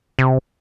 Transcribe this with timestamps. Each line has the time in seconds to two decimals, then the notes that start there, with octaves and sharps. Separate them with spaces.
0.19 C3